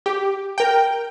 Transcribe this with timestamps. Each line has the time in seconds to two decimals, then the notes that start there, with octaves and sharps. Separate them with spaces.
0.06 G4
0.58 A#4 G5